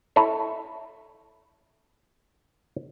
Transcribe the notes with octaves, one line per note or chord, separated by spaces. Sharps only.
E4 A4 C#5